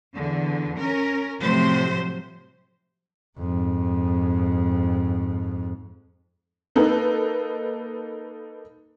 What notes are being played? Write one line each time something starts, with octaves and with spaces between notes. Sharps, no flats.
E2 D3
C#4 A#4
A2 C3 F3 F#3 A3 C5
F2 G#2
A#3 D#4 A4 B4